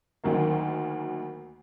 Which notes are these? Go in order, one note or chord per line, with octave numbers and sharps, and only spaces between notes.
D2 D#3 F#3 A#3